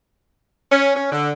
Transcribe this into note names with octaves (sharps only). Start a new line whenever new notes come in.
C#4
C#4
D3